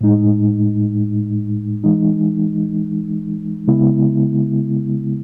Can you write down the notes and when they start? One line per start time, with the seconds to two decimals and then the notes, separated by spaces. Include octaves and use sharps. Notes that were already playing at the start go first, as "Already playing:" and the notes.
0.01 A2 G#3 D#4
1.84 E3 G#3 D#4
3.68 C#3 G#3 B3 E4